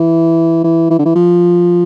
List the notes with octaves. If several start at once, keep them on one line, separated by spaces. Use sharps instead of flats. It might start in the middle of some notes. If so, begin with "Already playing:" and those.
Already playing: E3
E3
E3
D3
E3
F3